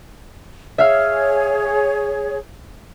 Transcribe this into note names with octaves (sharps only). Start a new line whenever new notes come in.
G#4 C#5 E5 F5 F6